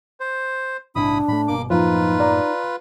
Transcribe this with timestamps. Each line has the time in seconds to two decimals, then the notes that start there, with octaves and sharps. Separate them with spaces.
0.20 C5
0.96 A#1 G#2 C3 D4 E4 B5 D#6
1.28 A2 G3 A3 B5
1.48 G1 B2 A#3 D6
1.70 F#2 A2 F3 A#3 D#4 F4 B4
2.20 D5 A#5